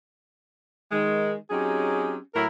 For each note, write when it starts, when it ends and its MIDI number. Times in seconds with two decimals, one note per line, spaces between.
0.91 1.35 51
0.91 1.35 56
1.51 2.17 54
1.51 2.17 60
1.51 2.17 61
1.51 2.17 63
1.51 2.17 67
1.51 2.17 68
2.35 2.45 45
2.35 2.45 54
2.35 2.45 64
2.35 2.45 70